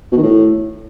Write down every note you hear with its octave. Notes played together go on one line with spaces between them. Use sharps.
B2
D#3
A2